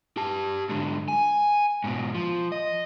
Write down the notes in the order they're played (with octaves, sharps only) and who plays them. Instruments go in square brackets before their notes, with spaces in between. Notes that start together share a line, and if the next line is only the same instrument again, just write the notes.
[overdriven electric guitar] G4 A5
G#2 D3
G#5
G#2 B2
F3
D#5